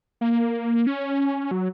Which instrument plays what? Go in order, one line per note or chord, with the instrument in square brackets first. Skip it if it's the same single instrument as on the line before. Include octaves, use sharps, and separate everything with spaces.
[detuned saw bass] A#3
C#4
F#3